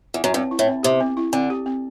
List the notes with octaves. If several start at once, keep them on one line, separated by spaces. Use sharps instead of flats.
E2
F#2
G2 C4
E4
A2
C4
C3 G4
C4
E4
D3 C4
G4
C4